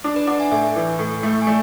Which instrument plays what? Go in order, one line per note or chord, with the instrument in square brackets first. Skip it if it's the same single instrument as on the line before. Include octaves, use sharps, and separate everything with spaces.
[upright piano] D4
[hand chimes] B4 D5
[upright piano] D4 [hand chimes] D5 F#5
[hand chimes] E5 G#5
[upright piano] A2 [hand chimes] E5 G#5
[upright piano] E3
A2
A3
[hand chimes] G#5
[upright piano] A3 [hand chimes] D5